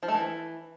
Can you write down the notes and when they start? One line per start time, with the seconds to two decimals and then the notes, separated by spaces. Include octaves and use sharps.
0.03 F3
0.08 A3
0.14 E3